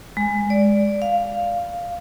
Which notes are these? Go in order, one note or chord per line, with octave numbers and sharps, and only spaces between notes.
G#3
D5
F5